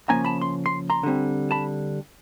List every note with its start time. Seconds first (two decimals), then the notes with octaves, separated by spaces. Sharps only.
0.09 C#3 F3 A#3 C#4 G#5 A#5
0.25 A5 B5
0.41 C6
0.66 C6
0.90 A#5 C6
1.03 D3 G3 C4
1.51 A5 B5